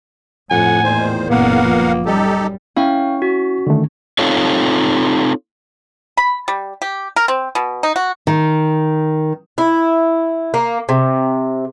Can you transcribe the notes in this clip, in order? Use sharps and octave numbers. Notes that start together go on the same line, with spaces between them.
F2 A2 F#5 G#5
E2 A#2 D#3 C5
F#1 A#2 A#3 B3 A#4 F5 F#5
F3
F#2 G3 D#4 G4 A4
C#4 E4 F5 G5
F#4
D3 D#3 A3
C4 D#4 F4 A4 C#5
B5
G3
G4
A#4
C4
B2
D#4
F#4
D#3
E4
A#3
C3